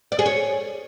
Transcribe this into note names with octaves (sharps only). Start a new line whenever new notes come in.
D5
G#4
C#5